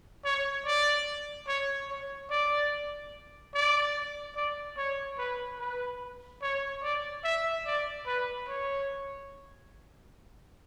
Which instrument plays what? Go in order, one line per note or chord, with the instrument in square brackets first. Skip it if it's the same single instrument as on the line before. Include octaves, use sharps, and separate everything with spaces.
[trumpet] C#5
D5
C#5
C#5
D5
D5
D5
C#5
B4
B4
C#5
D5
E5
D5
B4
C#5